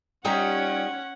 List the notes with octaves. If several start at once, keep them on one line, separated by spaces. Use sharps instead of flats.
G3 C#4 D#4 F4 G4 F#5 G5 A#5